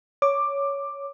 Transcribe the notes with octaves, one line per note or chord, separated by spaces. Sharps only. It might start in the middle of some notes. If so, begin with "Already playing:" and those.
C#5 D6